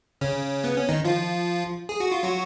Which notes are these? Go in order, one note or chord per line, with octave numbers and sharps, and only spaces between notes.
C#3 C#4
B3
C#4
D#3 D#4
F3 F4
G#4
F#4
F4
F#3 F#4